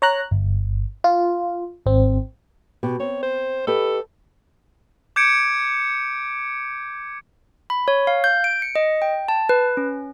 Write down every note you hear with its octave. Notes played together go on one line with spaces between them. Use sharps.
C#5 A#5 F#6
G1
F4
G#1 C4
B2 G4
C4 C#5
C5
G4 A4 B4 D#5
D6 G6 G#6 C#7 D7
B5
C#5
F5
G6
D7
C#7
D#5
G5
A5
B4
C#4